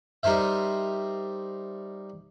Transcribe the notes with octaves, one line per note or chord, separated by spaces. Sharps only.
G3 D#4 A#4 C5 E5